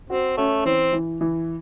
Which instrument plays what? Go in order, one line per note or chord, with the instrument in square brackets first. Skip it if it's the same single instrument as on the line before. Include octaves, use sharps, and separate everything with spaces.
[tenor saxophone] C4 [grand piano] F#4
[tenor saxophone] A3 [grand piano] C#4
[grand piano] E3 [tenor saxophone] C4
[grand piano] E3
E3